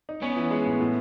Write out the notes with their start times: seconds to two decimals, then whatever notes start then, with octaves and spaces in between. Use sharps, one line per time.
0.09 D#4
0.22 B3 C#4
0.37 E3
0.51 G#3
0.66 A2
0.81 A2